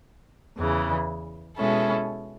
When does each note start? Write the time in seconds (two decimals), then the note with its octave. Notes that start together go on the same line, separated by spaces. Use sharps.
0.59 E2 C#3 E3
1.57 B2 G#3 C#4 E4 A4